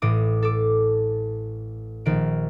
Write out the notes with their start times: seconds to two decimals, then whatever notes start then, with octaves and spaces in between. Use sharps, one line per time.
0.02 A1 A2 D6 D#6 D7
0.42 A4 D6
2.06 A#1 D#3 D7